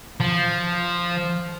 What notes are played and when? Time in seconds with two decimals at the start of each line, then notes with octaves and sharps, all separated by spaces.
0.20 F3